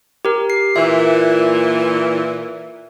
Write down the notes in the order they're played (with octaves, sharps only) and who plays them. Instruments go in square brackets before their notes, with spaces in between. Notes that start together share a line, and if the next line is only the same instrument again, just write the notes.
[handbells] G4 A#4
C7
[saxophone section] A#2 E3 [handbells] E5